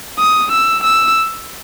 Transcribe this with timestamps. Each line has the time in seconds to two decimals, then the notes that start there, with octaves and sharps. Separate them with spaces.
0.19 D#6
0.52 E6
0.83 E6